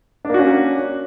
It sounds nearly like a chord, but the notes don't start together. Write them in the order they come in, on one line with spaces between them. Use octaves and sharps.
D4 A#3 F#4 C#4